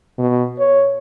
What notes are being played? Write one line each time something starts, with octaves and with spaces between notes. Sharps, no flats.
B2
C#5